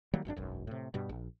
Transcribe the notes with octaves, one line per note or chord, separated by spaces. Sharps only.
D#3 F#3 G3 A#3
G#1 F#2 B2 D4
E1 B1 F#2
A2 C3
G2 B2 G3
A#1